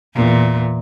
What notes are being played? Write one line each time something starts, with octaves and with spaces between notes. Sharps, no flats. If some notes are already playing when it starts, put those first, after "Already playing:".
E2 A#2